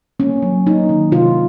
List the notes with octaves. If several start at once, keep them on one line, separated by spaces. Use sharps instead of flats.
A#3 C#4
F#3
A#3 D#4
D#3
C3 F4